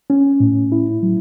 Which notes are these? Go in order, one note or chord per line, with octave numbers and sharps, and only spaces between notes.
C#4
A2
E4
F#3